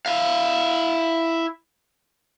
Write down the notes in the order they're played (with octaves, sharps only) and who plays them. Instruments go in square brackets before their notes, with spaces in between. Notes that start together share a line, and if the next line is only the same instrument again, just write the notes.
[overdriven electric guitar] E4 F5